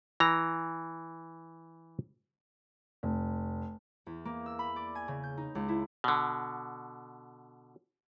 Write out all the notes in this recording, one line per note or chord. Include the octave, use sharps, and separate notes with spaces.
E3 A#5
F1
E2
A#3
E6
B5
D5
G#5
C#3
G6
D#4
C#2
E4
B2 D3